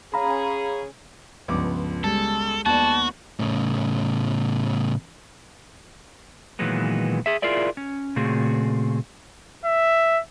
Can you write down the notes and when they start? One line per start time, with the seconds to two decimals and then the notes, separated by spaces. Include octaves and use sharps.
0.14 C#4 G#4 F5 A#5 B5
1.48 C#2 G2 F3 B3 D4 D6
2.04 G3 G#3 A4
2.66 D#2 B3 F#4 D5 A5
3.39 A2 C#3
6.59 A#2 D#3 E3 F#3 G#3 B3
7.26 G#4 E5
7.42 E4 F4 G#4 A#4 D5 E5
7.77 C#4
8.16 A#2 C#3 A3 C4 F#4 G#4
9.65 E5